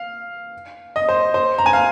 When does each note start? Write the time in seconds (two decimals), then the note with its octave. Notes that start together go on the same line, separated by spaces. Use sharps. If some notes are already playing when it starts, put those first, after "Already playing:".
Already playing: F5
0.96 D#5
1.09 C5
1.34 C5
1.58 A#5
1.66 G#5
1.73 F5